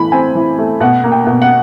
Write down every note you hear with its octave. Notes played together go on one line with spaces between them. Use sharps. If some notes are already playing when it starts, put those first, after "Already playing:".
Already playing: E3 A3 B5
C4 G#5
E3
A3
B2 F#5
A#3
G5
B2
F#5